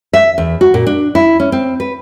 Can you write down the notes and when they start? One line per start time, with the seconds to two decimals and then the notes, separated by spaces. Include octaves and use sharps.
0.13 E5
0.38 E2
0.61 F#4
0.74 A#2
0.87 D4
1.15 E4
1.40 C#4
1.52 C4
1.80 B4